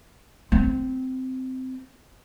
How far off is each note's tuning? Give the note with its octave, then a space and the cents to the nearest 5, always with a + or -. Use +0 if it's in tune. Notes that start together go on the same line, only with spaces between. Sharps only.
C4 -15